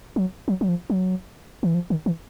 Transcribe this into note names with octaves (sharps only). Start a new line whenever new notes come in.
F#3
F#3
F#3
F3
F#3
E3
F3
D#3
E3